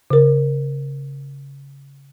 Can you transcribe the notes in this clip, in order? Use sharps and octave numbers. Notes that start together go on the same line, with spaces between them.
C#3 A#4